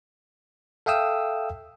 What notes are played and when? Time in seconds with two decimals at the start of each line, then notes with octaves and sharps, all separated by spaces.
0.86 A4 E5 F5 G5 D#6 E6